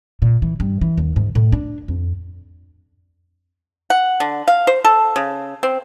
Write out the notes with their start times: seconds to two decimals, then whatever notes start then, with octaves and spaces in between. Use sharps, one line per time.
0.22 A#2
0.42 E3
0.60 G2
0.81 E3
0.97 D#2
1.16 G#2
1.35 A2
1.52 D4
1.88 F2
3.90 F#5
4.20 D3
4.48 F5
4.67 C5
4.84 A4
5.16 C#3
5.63 C4